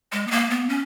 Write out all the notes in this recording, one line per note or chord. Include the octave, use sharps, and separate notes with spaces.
G#3
B3
A#3
B3
C#4